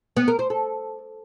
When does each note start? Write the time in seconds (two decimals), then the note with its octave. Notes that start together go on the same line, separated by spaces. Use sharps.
0.17 B3
0.28 A#4
0.39 C5
0.50 A4